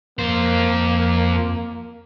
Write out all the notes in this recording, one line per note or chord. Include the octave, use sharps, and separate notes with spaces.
F2 A#3 C5